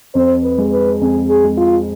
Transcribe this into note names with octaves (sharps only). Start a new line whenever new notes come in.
F2 C5
B4
G#3
B4
F2 G#4
G#4
G#3
F4